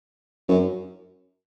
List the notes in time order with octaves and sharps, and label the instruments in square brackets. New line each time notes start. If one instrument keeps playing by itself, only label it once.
[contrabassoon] F#2